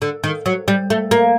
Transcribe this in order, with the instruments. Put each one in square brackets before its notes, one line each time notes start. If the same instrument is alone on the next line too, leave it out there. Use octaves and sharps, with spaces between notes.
[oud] D3
D#3
F#3
G3
A3
A#3